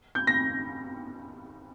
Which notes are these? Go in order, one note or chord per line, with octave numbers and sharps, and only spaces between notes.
G6
A#6